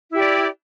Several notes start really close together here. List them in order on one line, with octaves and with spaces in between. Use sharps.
E4 G4 D5